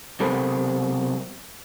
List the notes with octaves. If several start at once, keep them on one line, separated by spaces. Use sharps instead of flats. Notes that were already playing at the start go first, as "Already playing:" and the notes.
B1 C3 A4 A#4 C5 B5